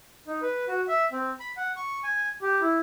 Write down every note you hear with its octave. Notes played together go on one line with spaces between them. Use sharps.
D#4
B4
F#4
E5
C4
B5
F#5
C#6
G#5
G4
E4